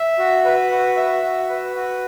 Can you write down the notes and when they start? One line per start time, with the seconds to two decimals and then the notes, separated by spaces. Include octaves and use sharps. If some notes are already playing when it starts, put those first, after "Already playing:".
Already playing: E5
0.19 F#4
0.45 B4
0.71 F#4
0.96 E5
1.23 F#4
1.49 B4
1.75 F#4